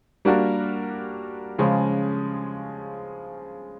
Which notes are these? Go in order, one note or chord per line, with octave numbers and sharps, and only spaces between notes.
G3 A#3 D4 F#4 A#4
C#3 F3 G#3 C#4